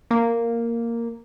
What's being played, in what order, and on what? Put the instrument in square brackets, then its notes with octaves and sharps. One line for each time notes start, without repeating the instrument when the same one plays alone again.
[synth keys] A#3